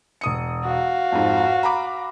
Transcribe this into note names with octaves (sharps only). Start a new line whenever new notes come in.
E1 D#6 C#7
F#4 F5
F2 G#2
A#5 B5 D6